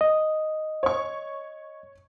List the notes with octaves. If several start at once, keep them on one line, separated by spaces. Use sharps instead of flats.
D#5
C#5 C#6